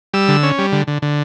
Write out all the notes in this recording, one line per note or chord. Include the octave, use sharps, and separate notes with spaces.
G3 E6
D3
C#4
G3
D3
D3
D3